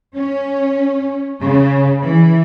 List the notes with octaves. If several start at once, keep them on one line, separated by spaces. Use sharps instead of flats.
C#4
C#3
E3